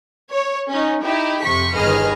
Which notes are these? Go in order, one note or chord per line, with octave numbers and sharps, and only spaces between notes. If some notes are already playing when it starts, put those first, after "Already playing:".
C#5
C#4 D#4
D#4 E4 G4
F2 C3 C#6 B6
G1 D#3 G#4 B4 D#5 F6